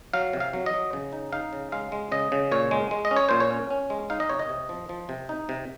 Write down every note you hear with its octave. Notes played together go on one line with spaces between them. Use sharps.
F#3 F5
C3
F5
F#3
D#5
F#3
C#3
D#4
D#4 F5
C#3
G#3 F5
G#3
C#3 D#5
C#3
A#2 C#5
G#3
G#3
D#5
C#4
C#5
A#2 C5
C#5
C#4
C#4
G#3
D#4 F5
D#5
C3 C#5
D#5
C3
F3
F3
C3
D#4
C3